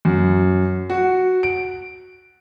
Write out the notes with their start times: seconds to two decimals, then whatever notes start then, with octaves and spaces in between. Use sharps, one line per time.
0.05 F#2
0.90 F#4
1.43 D7